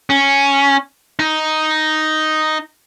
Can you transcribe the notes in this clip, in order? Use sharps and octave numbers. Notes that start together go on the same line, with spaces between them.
C#4
D#4